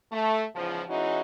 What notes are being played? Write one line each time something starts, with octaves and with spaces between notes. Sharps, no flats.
A3
E2 G#2 C#3 F3
E3 G#3 C#4 D#4 E4 F#4